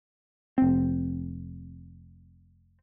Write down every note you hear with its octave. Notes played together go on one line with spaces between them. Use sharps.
F1 C4